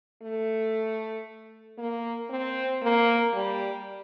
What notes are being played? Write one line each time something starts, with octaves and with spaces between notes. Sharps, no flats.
A3
A#3
C4
A#3
G3